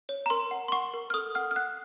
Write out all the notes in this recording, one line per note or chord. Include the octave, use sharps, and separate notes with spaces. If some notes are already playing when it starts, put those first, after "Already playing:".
C#5
A#5
A#4 C6
F#5
C6
F#5 C#6
A#4
F6
A4 D#6
F#5 F6
F6
F#5 F#6